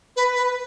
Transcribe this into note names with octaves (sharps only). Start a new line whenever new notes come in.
B4
B4